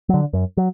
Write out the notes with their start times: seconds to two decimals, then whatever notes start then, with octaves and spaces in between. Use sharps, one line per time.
0.09 D3 F#3
0.33 F#2
0.57 F#3